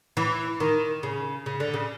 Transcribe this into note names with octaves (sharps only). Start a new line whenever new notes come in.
E3
D#3
C#3
C#3
D3
C#3